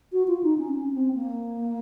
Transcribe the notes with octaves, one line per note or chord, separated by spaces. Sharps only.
F#4
F4
D#4
C#4
C#4
C#4
C4
A#3